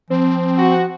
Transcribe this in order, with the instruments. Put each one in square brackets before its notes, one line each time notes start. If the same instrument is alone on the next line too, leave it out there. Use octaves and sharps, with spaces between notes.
[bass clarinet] F3 [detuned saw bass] C4
[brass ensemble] F#4